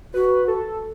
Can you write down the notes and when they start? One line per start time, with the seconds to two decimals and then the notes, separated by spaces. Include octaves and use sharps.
0.14 F#4 B4
0.48 A4